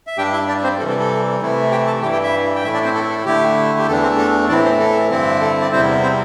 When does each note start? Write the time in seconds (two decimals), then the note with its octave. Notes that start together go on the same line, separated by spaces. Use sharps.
0.07 E5
0.17 G2 G3 D4 G4 G5
0.33 E4 E5
0.48 D4 D5
0.63 C4 C5
0.79 C3 E3 G3 A4
0.89 A4
1.00 A4
1.40 C3 E3 A3 E4
1.71 G4 G5
1.87 A4 A5
2.02 G2 E3 G3 E4 G4 G5
2.12 G4 G5
2.23 E4 E5
2.55 G5
2.64 A2 A3 E4 E5
2.74 D4 D5
2.85 C4 C5
2.95 A4
3.10 A4
3.25 D3 A3 E4 G4
3.79 G4
3.87 E2 E3 A3 D4 A4
4.03 C4 C5
4.18 A4
4.49 A2 E3 C4 D4 E4 D5
4.64 C4 C5
4.79 A4
5.10 G2 D3 C4 E4
5.41 A4
5.61 D5
5.72 E2 C3 G3 C4 E4 C5
6.02 C4 C5